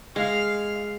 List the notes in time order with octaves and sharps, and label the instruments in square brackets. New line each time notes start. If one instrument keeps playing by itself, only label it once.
[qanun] G#3 [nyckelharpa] F5